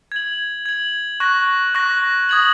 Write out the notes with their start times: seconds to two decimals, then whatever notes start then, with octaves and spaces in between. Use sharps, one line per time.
0.12 G#6 F#7
0.66 G#6 F#7
1.20 C#6 F#6 A#6
1.74 C#6 F#6 A#6
2.29 D#6 G#6 F#7